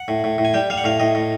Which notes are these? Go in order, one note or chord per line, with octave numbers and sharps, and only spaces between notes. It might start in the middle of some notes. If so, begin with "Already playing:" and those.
Already playing: F#5
A2
A2
A2
G#5
G3 G5
G3 F5
F#5
A2 F5
A2 D#5
A2